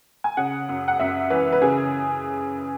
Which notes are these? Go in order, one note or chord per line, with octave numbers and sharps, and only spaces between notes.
G#5
C#3 F#5
F#2
F#5
F#2 E5
E3 B4
B4
C#3 G#4